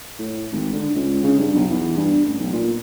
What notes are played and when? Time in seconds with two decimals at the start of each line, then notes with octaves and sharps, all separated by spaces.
0.19 A2
0.52 G#1
0.73 D3
0.95 C#2
1.23 C#3
1.39 G2
1.55 B1
1.70 E2
1.97 G2
2.25 A1
2.39 B1
2.53 A#2